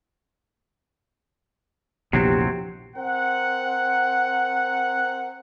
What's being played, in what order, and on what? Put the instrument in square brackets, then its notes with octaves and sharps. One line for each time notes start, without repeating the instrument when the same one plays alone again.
[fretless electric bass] A#1 E2 [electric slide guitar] C3 F#3 C4 [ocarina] G4
[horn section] C4 A#4 F#5